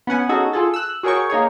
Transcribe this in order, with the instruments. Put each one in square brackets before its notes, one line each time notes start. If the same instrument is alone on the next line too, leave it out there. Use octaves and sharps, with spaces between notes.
[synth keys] B3 C#4 F#5 G#5
C#4 D#4 F#4 G#4 A4
F4 G#4 A4
E6 F#6
F#4 G#4 A#4 C#5 G5 C#6
A#3 D#4 G#4 C#5